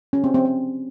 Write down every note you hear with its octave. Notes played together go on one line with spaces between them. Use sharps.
C#4
C4
C4
C4